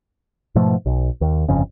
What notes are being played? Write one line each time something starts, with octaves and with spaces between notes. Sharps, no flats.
G#2 B2 F3 A3
B1
D#2
G1 F2 C#3